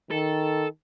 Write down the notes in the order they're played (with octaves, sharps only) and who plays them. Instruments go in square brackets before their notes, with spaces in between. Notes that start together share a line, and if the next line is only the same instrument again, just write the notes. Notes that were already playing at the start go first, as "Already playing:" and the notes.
[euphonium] D#3 [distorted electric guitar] A4